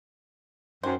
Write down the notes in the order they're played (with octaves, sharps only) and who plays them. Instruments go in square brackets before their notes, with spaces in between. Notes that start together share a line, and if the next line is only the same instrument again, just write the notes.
[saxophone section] F#2 [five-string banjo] D#3 C5